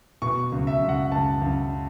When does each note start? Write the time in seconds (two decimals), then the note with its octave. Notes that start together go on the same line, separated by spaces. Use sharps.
0.22 B2 C#6
0.52 C#2
0.67 E5
0.81 C#2
0.89 F#5
1.12 C#2 A5
1.42 C#2